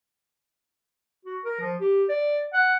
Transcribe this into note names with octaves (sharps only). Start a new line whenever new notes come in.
F#4
A#4
F3
G4
D5
F#5